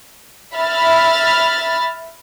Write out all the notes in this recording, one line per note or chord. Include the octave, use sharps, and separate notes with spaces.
E5 B5 F6 A6